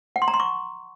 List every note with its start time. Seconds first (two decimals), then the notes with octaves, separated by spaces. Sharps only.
0.16 F#5
0.22 C6
0.28 A#5
0.34 C6
0.40 C#6